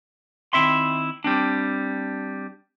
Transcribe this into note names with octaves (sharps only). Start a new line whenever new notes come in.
D#3 C4 E4 E5 C6
G3 C4 D4